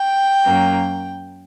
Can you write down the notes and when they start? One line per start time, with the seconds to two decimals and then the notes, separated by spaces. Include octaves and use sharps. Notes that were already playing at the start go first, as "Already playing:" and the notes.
Already playing: G5
0.45 F#2 F#3 A#3